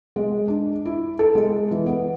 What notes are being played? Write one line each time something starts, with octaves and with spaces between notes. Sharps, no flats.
G#3
D4
E4
A4
G#3
E3
B3